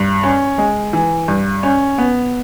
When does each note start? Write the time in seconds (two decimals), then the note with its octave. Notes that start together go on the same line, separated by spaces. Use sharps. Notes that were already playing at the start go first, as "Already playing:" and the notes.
Already playing: G2
0.23 C#4
0.58 G#3
0.93 E3
1.28 G2
1.63 C#4
1.98 B3